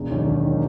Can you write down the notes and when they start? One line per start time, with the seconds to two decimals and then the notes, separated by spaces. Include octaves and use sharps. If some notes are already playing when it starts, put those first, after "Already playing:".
Already playing: E1
0.10 D#2 D#3 F#3
0.27 E1
0.45 D#3 F#3